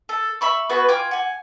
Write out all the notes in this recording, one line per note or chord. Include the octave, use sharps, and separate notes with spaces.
A4
E5 B5 C#6
B3 F#4 G#4 B4
F4 G5 G#5 D6
F#5 G#5